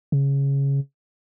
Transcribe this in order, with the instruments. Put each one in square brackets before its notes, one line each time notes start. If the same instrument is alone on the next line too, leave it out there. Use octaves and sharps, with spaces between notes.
[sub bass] C#3